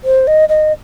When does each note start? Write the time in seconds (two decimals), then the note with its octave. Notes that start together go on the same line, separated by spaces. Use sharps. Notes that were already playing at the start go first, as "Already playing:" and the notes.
0.04 C5
0.27 D#5
0.49 D#5